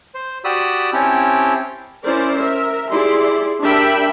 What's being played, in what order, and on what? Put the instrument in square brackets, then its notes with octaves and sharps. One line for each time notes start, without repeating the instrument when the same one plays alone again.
[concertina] C5
F#4 G4 D5 B5 D#6 E6
C4 C#4 E4 G4 C#5 A5
[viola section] C#4 E4 A#4 C5 D5
A#4 E5
E4 G4 G#4 D5 C6
D4 G4 A#4 E5 G5 B5